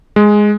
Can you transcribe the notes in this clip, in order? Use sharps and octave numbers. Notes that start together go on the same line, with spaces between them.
G#3